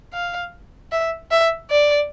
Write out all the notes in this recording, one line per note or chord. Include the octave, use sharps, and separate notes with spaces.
F5
E5
E5
D5